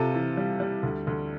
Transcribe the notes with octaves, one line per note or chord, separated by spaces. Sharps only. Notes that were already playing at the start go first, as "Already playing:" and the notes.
Already playing: C3 F4 A4
E3
G3
G3
D2
D2